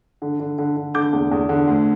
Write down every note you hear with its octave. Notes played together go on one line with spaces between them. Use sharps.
D3
D3
D3
D3
D3 D6 G6
E2
E2
D3
D2